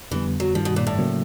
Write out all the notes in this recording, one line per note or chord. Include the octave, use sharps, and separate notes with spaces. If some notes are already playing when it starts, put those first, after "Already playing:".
F2 D3 E3 G3 B3
F#3
G2 D#3 F3 G3
B2
A#2
A2
C#3 F#3 A#3